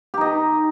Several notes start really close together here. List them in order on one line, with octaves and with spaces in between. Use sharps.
G4 D#4 D#5